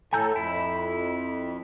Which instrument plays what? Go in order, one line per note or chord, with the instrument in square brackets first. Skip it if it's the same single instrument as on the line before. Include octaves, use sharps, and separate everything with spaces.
[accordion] A2 A4 [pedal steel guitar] G#5 A#5 G6
[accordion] F2 [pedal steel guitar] E4